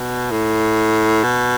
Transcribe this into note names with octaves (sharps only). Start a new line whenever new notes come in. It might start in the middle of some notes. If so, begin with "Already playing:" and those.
Already playing: B2
A2
B2